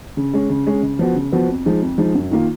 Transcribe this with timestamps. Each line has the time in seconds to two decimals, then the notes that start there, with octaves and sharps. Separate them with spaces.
0.17 C#3
0.34 G#3 C#4
0.50 C#3
0.67 G#3 C#4
0.83 C#3
0.99 F3 B3 F#4
1.15 C#3
1.32 F3 B3 F#4
1.49 F2
1.65 F3 G#3 D#4
1.82 F2
1.98 F3 G#3 D#4
2.15 F#2
2.31 D#3 A#3 F4